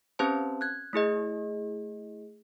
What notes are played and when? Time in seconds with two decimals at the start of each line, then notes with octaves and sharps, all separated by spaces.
0.19 C4 C#4 G4 B4 C5 A5
0.61 F#6 G#6
0.93 A3 E4 G#4 D#5